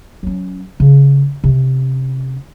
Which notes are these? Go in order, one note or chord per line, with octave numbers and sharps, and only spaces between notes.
F#3 C#4
C#3
C3 C#4